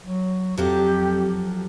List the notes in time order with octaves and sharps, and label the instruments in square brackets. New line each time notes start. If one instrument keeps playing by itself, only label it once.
[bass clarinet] F#3
[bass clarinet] F2 [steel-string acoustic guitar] F3 F#3 A4 [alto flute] G4